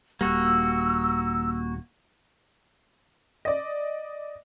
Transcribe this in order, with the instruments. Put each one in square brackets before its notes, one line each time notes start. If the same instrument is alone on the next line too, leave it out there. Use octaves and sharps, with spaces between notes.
[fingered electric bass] D#1 G3 [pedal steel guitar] A#3 F#4 [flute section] E6
[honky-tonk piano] D5 D#5